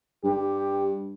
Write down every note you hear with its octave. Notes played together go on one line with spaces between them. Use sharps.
G2 G4